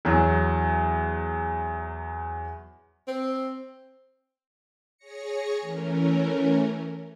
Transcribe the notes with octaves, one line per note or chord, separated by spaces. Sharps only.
E2 F#3
C4
G#4 C#5 A#6 C#7
E3 A3 C#4 A#4